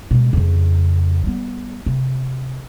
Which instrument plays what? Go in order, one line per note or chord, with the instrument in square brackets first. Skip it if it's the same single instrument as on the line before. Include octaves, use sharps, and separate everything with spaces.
[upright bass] B2 G#3
F2 C#3
G3 B3
C3